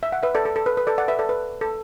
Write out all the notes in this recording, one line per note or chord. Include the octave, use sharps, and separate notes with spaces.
E5
F#5
B4 E5
A4 D5
A4
A4
B4
B4
A4 D5
D5 F#5
B4 E5
A4 D5
B4
A4